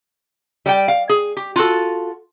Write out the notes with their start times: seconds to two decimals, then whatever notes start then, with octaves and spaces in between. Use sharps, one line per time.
0.66 G3 D5 G5
0.88 F5
1.09 G#4
1.37 G4
1.56 F4 F#4 A4